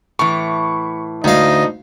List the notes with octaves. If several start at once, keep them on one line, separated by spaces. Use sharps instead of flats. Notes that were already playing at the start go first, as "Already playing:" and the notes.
A2 E3 C#6
D2 D#4 D#5 F5